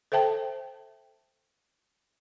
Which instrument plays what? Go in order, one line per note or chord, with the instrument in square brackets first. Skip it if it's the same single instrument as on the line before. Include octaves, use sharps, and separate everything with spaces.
[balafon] A4 C5 E5 G5 A5